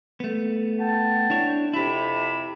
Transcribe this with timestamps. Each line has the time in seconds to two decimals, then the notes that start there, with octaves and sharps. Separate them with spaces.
0.20 A3 B3
0.80 F#5 G5 A5
1.30 D4 E4 C#5
1.74 F2 C3 E4 G4 B5